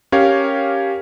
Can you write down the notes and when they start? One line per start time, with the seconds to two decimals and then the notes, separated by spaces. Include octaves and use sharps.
0.12 C#4 G4 A#4 C#5 F5